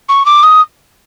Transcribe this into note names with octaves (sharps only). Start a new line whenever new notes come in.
C#6
D6
D#6